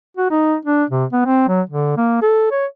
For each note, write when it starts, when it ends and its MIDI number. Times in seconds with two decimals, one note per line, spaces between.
0.17 0.30 66
0.31 0.56 63
0.65 0.84 62
0.90 1.05 48
1.13 1.22 59
1.26 1.45 60
1.49 1.62 54
1.70 1.95 50
1.97 2.18 58
2.22 2.48 69
2.52 2.66 73